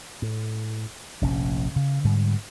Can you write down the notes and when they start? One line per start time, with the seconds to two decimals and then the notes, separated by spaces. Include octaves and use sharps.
0.22 A2
1.22 F1 A#1 C3 C#4
1.76 C#3
2.04 G#2 D3 G3